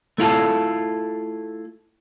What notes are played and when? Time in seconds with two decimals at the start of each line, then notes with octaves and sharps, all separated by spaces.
0.18 A3 E4 F4 A4